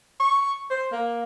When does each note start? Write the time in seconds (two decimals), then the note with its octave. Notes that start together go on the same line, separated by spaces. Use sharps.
0.20 C#6
0.70 C5
0.92 A#3